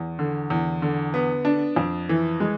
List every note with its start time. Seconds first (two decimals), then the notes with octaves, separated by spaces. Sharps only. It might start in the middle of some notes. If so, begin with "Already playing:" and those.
Already playing: E2
0.19 D3
0.50 E2
0.82 D3
1.14 B3
1.45 D4
1.76 F2
2.09 E3
2.40 G#3